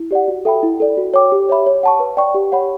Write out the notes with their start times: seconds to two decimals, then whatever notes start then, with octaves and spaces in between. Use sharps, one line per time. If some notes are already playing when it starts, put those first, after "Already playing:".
Already playing: E4
0.11 G4 D5 F#5
0.28 F#4
0.45 A4 E5 G5 B5
0.63 E4
0.80 A4 D5
0.97 F#4
1.14 C#5 G5 D6
1.32 G4
1.49 C#5 E5 B5
1.66 C#5
1.83 F#5 A5 C#6
2.00 B4
2.17 D5 G5 C#6
2.34 G4
2.52 C#5 F#5 B5